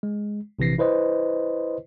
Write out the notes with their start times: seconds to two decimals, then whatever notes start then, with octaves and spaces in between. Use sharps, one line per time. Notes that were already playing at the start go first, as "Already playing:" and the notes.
0.03 G#3
0.59 A#1 C3 E3 A#6 C7
0.78 E4 B4 C5 D#5